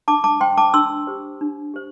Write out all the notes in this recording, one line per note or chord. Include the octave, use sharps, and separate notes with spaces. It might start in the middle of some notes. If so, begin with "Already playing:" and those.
D4 A5 D6
A5 D6
C5 G5 C6
A5 D6
D4 C6 E6
G4 C5
D4
G4 C5